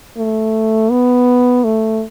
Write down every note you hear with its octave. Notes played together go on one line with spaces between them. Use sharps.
A3
B3
A3